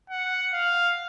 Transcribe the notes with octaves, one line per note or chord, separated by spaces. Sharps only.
F#5
F5